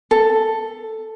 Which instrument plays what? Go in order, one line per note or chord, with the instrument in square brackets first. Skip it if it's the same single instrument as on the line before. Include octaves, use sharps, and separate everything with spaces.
[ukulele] A4